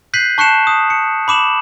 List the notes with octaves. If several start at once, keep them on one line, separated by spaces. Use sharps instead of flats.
F#6 G6 B6 C7 D#7 F#7
A5 C#6 F#6 C7 C#7 E7
D#6
C#7
B5 D6 E7 F#7